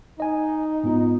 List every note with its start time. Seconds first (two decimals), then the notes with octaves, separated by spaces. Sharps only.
0.20 D#4 D#5 G#5
0.84 G#2 B3 F4